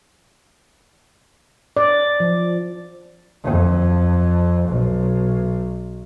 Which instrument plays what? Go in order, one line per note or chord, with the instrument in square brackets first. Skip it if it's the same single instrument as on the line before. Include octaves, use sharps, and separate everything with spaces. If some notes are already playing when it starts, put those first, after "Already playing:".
[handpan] D5
F3
[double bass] F2
B1